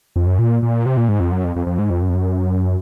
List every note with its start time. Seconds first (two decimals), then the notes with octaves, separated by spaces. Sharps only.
0.16 F2
0.27 F#2
0.39 A#2
0.62 A#2
0.86 C3
0.97 A#2
1.09 G#2
1.20 F2
1.32 F#2
1.44 F2
1.56 F2
1.67 F2
1.79 G#2
1.90 F2
2.02 F#2
2.09 F2
2.14 F#2